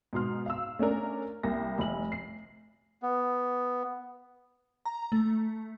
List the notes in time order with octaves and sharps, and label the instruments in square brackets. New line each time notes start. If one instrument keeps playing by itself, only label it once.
[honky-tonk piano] G#2 B2 C6 F6
F5 E6
A3 C#4 D4 A#4
C2 A#3 A#6
F1 F#7
C7
[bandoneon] B3
[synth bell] A#5
A3